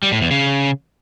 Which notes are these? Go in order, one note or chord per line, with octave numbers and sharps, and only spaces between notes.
G3
A2
E2
C#3